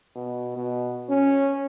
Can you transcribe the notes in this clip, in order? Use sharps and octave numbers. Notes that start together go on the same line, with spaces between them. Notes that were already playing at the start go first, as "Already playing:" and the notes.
B2
B2
C#4